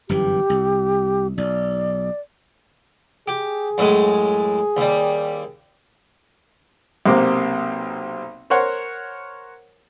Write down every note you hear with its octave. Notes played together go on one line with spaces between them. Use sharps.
G1 F#2 E3 G4
C2
B1 D5
G4 G#4
F#2 A2 G#3
D#2 G3
B1 C3 A#3 C4 C5 D6
A#4 C5 C#5 F#5